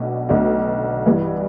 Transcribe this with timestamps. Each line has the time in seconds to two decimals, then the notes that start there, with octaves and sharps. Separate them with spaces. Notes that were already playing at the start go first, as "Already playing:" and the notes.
Already playing: B1 B2 A3 D4 F#4
0.29 B1 B2 A3 D4 F#4
1.06 G2 E3 G3 B3